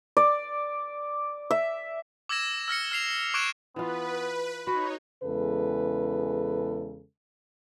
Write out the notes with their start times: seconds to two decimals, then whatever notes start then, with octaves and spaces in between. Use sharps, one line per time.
0.17 D5
1.51 E5
2.29 D6 E6 G#6 A#6 E7
2.68 E6 F6 A#6 C#7
2.92 F6 C7 F7
3.34 C#6 D6 F#6 G#6 D7 E7
3.76 E3 B3 F4 B4
4.67 D#4 F#4 C#5 B5
5.24 E2 C#3 G#3 A4 B4